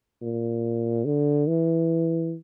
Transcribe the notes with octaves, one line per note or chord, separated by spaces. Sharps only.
A#2
D3
E3